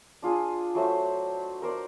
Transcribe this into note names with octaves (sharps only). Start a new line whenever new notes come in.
D4 F4 G#4
F#3 A3 C5 E5
A#4 C5 D5